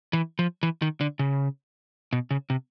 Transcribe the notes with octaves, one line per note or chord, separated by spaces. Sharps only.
E3
F3
E3
D#3
D3
C#3
B2
C#3
C3